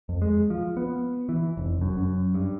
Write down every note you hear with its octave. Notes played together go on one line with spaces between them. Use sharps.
F2
G#3
F3
B3
E3
F1
F#2
F#2
G2